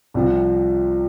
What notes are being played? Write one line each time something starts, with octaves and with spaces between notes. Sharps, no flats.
C2 C3 F3